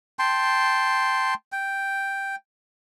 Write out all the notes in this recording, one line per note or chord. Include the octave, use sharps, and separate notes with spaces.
G5 A5 C6
G5